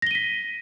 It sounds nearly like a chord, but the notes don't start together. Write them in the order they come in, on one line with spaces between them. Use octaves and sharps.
A#6 G7 D#7 B6